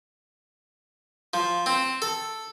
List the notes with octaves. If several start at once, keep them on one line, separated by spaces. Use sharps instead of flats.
F3
C4
A4